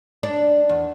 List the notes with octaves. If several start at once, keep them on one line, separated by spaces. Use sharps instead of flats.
D4
E2